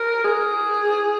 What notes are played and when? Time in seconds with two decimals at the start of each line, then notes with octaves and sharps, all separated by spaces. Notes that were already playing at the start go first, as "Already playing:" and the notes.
Already playing: A#4
0.24 G#4